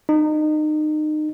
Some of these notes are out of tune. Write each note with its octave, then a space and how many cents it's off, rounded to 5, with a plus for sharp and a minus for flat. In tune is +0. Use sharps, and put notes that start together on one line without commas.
D#4 -30